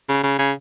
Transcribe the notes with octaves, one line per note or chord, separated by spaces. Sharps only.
C#3
C#3
C#3